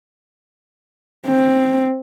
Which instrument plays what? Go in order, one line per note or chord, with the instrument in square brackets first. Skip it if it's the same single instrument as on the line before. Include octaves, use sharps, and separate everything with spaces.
[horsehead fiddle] C4